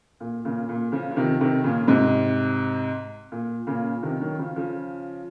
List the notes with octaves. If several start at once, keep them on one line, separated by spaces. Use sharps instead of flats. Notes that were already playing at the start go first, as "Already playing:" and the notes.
A#2
A#2 C#3
A#2
C#3 F3
F3
C3 D#3
C3 D#3
A#2 C#3
G#2 C3
A#2
A#2 C#3
C3 D#3
D#3 F#3
C#3 F3
C#3 F3